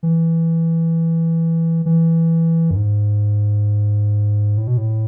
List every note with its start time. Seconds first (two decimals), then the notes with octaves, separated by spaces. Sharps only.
0.03 E3
1.86 E3
2.71 F#2
2.76 G#2
4.58 A2
4.67 B2
4.77 A2